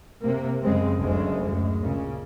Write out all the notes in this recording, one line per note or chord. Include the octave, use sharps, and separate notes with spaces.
C3 A#3
F#2 C#3 G#3 C4
F#1 D2 C#3 G#3
F#2 G#3
A#2 C#3